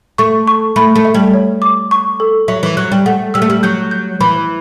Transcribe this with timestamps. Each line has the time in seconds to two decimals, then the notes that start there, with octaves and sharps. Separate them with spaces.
0.18 A3 C#6
0.48 C#6
0.76 A3 B5
0.96 A3
1.05 E5
1.14 G3
1.34 C#5
1.62 D6
1.91 C#6
2.20 A4
2.48 F#3 E5
2.63 E3
2.77 F#3 F#6
2.92 G3
3.06 A3 F#5
3.34 G3 E6
3.42 A3
3.50 G3
3.63 F#3 G6
3.91 G6
4.21 E3 B5